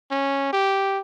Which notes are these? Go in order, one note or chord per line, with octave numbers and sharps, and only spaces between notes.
C#4
G4